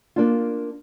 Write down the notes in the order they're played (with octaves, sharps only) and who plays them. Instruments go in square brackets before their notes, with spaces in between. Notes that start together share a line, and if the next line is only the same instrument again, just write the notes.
[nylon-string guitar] A#3 D4 F4